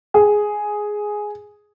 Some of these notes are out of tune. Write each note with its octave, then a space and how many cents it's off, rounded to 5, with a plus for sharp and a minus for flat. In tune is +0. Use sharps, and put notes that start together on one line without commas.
G#4 +5